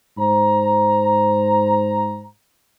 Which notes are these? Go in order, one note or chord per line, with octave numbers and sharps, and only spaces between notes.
G#2 C5 A#5